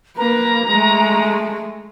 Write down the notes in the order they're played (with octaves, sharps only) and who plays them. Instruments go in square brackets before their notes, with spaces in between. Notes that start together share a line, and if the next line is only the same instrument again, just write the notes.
[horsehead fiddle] A#3 B4 [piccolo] A#5
[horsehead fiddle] G#3 A3